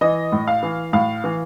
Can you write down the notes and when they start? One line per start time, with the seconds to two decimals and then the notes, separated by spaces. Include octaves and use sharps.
0.01 E3 D#5
0.32 A2
0.48 F5
0.63 E3
0.93 A2 F5
1.24 E3